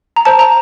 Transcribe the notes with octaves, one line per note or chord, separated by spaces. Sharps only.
A#5
C5 A5
A#5